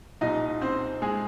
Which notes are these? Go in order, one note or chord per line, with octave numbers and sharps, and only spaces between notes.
C2 A#2 F3 D#4 D#5
C4 C5
G#3 G#4